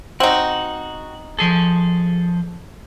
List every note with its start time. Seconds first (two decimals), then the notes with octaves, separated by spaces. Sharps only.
0.20 C4 D#4 F#4
1.39 F3 G#4 A4